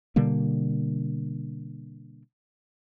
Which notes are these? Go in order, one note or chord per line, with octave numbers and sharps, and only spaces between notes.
B2 D3 G3 A#3